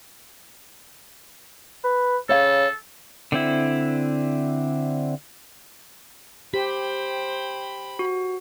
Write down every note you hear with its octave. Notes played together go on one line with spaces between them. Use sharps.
B4
C#3 A4 C#5 F5
D3 C4 E4
G4 C5 G5 B5
F#4